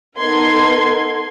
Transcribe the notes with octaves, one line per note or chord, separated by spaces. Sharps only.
B3 D#4 A4 A#4 C6 G#6